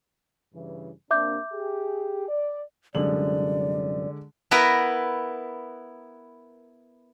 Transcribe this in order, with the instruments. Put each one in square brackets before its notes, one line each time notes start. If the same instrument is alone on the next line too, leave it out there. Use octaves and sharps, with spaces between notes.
[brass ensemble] G2 C#3 E3
[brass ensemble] C3 A#3 D4 [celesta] E5 D6 G6
[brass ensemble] G4 G#4
D5
[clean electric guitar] C2 F#2 [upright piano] D3 G#3 F#7 [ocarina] D5
[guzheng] B3 E4 A#4 B4 A#5